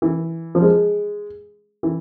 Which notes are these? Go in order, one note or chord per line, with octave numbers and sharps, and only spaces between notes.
E3
F3
G#3
E3